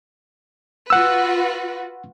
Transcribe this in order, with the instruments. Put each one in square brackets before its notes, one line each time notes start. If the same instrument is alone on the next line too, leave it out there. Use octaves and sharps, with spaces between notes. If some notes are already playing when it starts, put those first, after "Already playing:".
[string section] F4 F#4 B4 [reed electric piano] F#5 E6